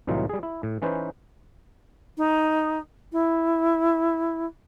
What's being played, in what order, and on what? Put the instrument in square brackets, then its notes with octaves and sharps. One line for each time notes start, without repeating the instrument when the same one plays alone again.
[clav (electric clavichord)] C2 A2 E3 F#3 D#4 F4
G3 G#4
E4
A2
E3 C#4 D#4 B4 C5
[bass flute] D#4
E4